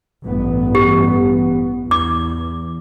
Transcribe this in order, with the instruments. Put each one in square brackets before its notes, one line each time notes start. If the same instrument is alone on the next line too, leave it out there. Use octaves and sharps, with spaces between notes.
[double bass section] A1 G2 B3
[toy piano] G4
[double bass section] E2 [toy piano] D6